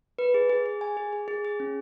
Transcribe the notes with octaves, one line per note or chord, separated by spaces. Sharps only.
B4
G#4
G#4
G#4
G#5
G#4
G#4
G#4
G#4
C#4